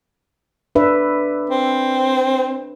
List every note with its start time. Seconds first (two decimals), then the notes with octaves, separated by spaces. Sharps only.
0.75 D4 B4 E5
1.50 C4